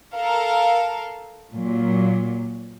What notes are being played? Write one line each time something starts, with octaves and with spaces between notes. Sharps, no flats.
A4 A#4 F5
A#2 F#3